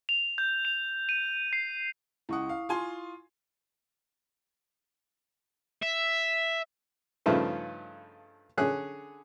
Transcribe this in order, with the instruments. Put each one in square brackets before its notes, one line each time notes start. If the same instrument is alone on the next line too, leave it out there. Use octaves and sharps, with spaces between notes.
[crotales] F7
G6
F7
D#7
C7
[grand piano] C#2 F#5 [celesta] E4 C#6 D#6
[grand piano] F5
F4 G#5 C6
[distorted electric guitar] E5
[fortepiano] G2 C#3 F3 A3 D#4 B4
D3 C#4 G#4 F#6